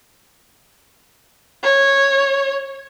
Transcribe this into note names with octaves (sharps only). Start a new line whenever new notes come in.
C#5